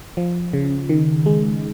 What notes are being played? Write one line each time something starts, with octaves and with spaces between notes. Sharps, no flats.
F3
C#3
D#3
G#3